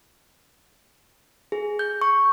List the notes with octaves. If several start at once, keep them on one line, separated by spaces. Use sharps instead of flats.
G#4
G6
C#6